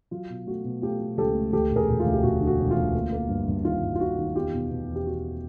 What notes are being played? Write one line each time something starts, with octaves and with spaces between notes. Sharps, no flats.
F#3 F4
B2
A3 F#4
B2
A3 F4 G4
B2
C#2 G4 A4
A3
D2 G4 A4
E1
G#4 A#4
E1
F4
D2
G4
E1 F#4
D3
F#4
E1
F4
D2
A#3
A#3
G2
G2
D#3 F4
G2
F4
D#3 F#4
D#3
E2 F4 G4
B2
B2
E2
G4
B2 F#4